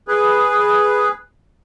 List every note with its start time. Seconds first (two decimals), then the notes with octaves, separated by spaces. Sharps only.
0.08 G#4 B4